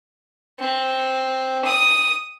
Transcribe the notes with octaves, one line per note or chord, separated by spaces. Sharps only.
C4
D#6